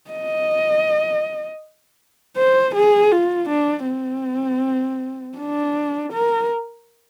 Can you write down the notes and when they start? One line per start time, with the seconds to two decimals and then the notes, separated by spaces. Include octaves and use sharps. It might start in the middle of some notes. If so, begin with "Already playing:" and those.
0.11 D#5
2.38 C5
2.75 G#4
3.12 F4
3.49 D4
3.88 C4
5.38 D4
6.13 A#4